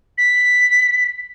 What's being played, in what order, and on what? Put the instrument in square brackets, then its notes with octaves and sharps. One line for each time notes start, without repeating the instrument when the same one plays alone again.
[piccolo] B6